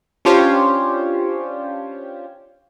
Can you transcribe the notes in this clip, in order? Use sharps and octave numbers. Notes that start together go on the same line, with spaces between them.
C#4 D4 F4 G4 C5 C#5